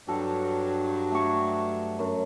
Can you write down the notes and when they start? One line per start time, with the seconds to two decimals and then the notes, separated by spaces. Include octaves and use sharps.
0.08 G2 F#3 A4
1.11 A3 C#6
1.99 F#2